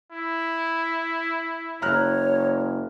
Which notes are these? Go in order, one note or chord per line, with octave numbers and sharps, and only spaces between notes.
E4
F#1 C#5 A#5 F6 F#6